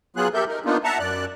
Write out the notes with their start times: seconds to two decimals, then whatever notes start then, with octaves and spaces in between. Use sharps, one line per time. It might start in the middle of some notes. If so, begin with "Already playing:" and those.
0.16 F#3 B3 F4 G#4 F#6
0.34 G4 A4 A#4 E5 G6
0.48 D#4 A#4
0.65 A#3 B3 D4 D#4 F4
0.84 E5 F#5 A5 A#5
0.99 F#2 D5 F#6